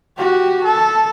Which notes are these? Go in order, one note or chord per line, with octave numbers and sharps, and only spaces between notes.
F#4 G4
A4